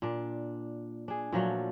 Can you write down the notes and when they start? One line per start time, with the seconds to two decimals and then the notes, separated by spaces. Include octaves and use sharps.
0.02 A#2 D4
1.08 D4 G#4
1.32 A#2 F3 F#3 A3